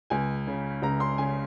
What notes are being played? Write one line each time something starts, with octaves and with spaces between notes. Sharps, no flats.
C#2 G#5
C#3
C#2 A#5
C6
C#3 G#5